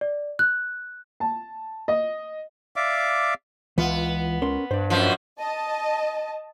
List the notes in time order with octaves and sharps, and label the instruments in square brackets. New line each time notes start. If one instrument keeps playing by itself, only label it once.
[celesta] D5
F#6
[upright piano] A5
D#5
[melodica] D5 E5 F5 D6
[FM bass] C#2 [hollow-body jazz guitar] E3 F4 F5 [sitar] B3
[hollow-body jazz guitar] C#4 A#4 C6
[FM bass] G2 [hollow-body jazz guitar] C5 D5
[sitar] F#2 B2 F3
[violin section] D#5 A5